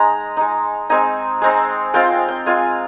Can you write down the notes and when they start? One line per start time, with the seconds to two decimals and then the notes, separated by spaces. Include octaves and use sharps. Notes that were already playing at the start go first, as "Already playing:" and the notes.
Already playing: G#3 D#4 A#5
0.37 G#3 D#4
0.90 G#3 C4 D#4 G#5
1.41 G#3 C4 D#4
1.94 G#3 C4 F4 G5
2.12 G5
2.28 G5
2.46 G#3 C4 F4 G#5